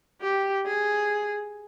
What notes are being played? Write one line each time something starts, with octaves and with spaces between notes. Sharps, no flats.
G4
G#4